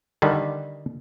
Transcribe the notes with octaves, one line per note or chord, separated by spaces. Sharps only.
D3 D#3 G3